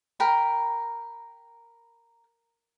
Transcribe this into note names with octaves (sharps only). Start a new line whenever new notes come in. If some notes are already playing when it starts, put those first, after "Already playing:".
A#4 G5 B5